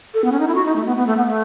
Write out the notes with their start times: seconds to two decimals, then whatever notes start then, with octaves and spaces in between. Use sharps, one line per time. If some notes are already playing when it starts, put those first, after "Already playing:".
0.14 A4
0.24 B3
0.32 C#4
0.40 D#4
0.47 E4
0.55 F#4
0.66 D#4
0.76 A3
0.86 B3
0.97 B3
1.07 A3
1.17 B3
1.27 A3